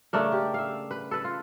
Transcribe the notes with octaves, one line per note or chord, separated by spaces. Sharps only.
C#3 A3 D4 A#4
G4
E5 F5
B4
A4 B4
F4